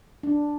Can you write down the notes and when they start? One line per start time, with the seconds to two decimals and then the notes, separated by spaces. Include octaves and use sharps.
0.23 D4